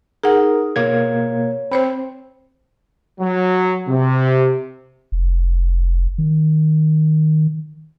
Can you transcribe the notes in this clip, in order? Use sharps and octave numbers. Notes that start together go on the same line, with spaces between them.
D#4 G#4 A#4 F#5
B2 A#3 C#5 G#6
C4 C5 C#5 B5
F#3
C3
F1
D#3